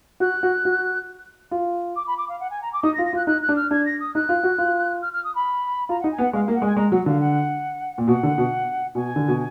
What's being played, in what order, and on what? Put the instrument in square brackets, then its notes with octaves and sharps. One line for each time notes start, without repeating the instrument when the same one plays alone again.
[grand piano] F#4 [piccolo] F#6
[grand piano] F#4
F#4
F4
[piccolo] D6
B5
D6
F5
F#5
G#5
A#5
D6
[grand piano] D#4 [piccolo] D#6
[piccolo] A#6
[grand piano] F4
[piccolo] A#6
[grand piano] F4
[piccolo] F#6
[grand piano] D#4 [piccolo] F#6
[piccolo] F#6
[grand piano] D4
[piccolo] F6
[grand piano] D4 [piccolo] G#6
[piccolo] A#6
D#6
[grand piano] D#4 [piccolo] F#6
[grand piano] F4
F#4
F4
[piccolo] F6
F6
D#6
B5
[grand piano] F4 [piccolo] A#5
[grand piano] D#4 [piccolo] F#5
[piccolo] G#5
[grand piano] B3
[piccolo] F#5
[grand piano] G#3 [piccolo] F5
[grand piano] A#3 [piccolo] F5
[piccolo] F#5
[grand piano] G#3
[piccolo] G#5
[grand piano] G#3 [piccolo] A#5
[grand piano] F#3 [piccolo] F#5
[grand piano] D3 [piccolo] F5
[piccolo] F#5
[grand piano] A#2
[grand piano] B2 [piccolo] F#5
[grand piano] D3
B2
[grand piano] B2 [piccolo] G#5
[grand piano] D3
B2